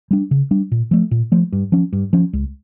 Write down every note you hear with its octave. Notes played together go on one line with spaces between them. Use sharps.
G3 D4
C#3
G3 D4
A#2
F3 A3
A#2
F3 A3
G2
F3 C#4
G2
F3 C#4
C#2